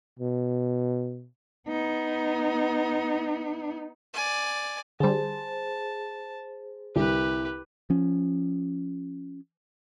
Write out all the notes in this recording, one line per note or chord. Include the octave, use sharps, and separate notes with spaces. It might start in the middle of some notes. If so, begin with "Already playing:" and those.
B2
B3 D#4
D5 G#5
D3 G3 G#4 C5 A5
C2 D3 G4 B4
F3 C#4